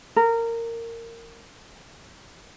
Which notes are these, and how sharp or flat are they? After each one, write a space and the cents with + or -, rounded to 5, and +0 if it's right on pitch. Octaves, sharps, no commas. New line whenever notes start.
A#4 -20